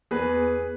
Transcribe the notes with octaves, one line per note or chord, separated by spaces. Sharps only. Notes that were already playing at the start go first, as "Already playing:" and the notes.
E2 G#4 B4